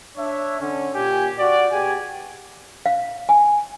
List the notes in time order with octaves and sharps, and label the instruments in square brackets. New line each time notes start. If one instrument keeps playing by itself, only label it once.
[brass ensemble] D4 C#5 E5
D3 C#4
A#2 G4 G#5
F#4 D5
B2 G4 G#4 G#5
[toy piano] F5
G#5